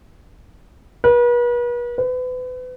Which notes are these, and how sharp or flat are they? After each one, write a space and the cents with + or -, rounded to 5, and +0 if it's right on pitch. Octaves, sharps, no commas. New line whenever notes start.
B4 -40
B4 +35